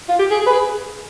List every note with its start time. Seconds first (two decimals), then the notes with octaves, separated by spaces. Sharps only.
0.09 F4
0.19 G4
0.31 G#4
0.41 G#4
0.47 B4
0.53 G#4